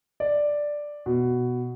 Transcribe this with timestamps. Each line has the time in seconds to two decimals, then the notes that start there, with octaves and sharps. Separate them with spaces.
0.20 D5
1.06 B2